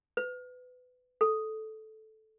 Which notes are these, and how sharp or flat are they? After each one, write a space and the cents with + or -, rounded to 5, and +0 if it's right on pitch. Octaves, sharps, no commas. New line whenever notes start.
B4 +25
A4 -10